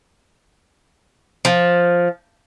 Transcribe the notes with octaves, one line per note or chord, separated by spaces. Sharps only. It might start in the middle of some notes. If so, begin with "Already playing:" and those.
F3